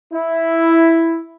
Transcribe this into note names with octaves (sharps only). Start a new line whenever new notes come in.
E4